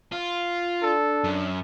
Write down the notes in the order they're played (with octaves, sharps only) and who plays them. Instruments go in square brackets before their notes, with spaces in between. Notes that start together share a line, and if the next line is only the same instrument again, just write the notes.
[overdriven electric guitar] F4
[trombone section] D4 [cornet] A4
[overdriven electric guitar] F#2